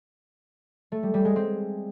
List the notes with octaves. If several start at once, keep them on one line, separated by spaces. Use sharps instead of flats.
A3
G3
G3
G#3
C4